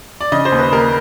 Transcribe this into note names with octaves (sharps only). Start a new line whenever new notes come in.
D5
C#3 D#5
C5
D#2
B4
D#2 A#4